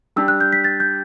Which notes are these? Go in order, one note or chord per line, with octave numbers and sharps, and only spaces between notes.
G3 D4 G4 E6
F#6
G6
B6
A6
G6